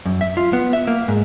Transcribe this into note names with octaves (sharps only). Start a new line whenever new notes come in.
F#2
E5
F4
B3
E5
A#3
G#2